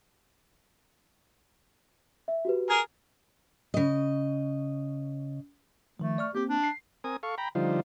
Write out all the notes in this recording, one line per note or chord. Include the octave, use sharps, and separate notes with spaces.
E5
F#4 G4 B4
G#4 A#4 G#6
C#3 D#5
D#3 F3 A3
D5 C#6 F6
A#3 C4 G4
D4
C7
C4 A#4 G#5 D#6
A4 F5 C#6
G5 A#5 B5
D3 F3 G3 D#4 F4 C5